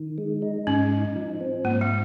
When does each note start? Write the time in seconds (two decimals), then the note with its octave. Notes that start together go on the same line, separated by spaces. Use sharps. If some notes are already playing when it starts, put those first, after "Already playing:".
Already playing: D#3
0.18 G#3
0.42 D#4
0.67 G#2 C#4
0.91 D#4
1.16 F3
1.41 C4
1.64 G#2 A#3
1.81 G#3